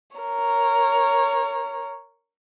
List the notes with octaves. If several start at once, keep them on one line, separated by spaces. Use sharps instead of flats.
A#4 C#5